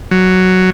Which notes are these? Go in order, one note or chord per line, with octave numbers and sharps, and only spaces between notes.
F#3